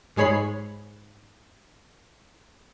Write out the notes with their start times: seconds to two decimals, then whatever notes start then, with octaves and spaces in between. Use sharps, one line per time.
0.16 G#2 G#3 G#4 C#5 B5 C7